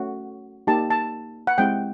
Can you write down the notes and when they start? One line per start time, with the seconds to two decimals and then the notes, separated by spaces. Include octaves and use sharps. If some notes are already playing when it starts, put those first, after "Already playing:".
Already playing: A3 C#4 F#4
0.67 A#3 D#4 G4 A5
0.90 A5
1.47 F#5
1.58 G#3 C4 E4 G4 G5